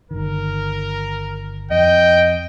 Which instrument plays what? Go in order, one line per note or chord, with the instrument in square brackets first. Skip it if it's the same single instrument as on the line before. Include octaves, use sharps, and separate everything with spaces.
[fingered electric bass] G1 D#3 [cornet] A#4
[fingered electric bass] F2 [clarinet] D#5 [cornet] G5